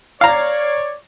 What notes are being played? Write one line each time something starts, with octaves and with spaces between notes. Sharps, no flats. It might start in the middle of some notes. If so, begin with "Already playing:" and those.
C#5 D5 F5 A#5